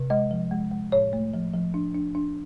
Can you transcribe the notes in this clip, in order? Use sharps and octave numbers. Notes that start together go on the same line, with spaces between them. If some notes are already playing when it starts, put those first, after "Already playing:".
Already playing: C3
G#3 D#5
F3
G#3
G#3
A2 C#5
A3
F3
F3
D4
D4
D4